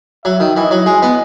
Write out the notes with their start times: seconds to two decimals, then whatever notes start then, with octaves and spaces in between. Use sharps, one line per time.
0.25 F#3 E5
0.40 D#3
0.56 E3 D#5
0.71 F#3
0.86 G#3
1.02 B3